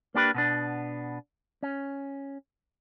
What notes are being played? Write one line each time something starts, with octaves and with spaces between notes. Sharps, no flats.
A#3 D4 G4 B4
B2 B3 D4
C#4